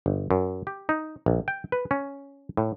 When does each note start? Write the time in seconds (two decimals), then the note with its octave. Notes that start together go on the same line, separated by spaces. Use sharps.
0.06 G1
0.31 F#2
0.67 G4
0.89 D#4
1.26 A#1
1.48 G5
1.72 B4
1.91 C#4
2.57 A2